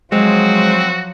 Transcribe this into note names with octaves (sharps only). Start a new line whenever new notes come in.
F3 F#3 G#3 C4 F#4